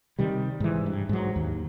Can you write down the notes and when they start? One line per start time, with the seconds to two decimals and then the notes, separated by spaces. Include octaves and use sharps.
0.19 C3 D#3 G3
0.60 G#2 E3
0.86 G2
1.09 G#2 F#3
1.36 D#2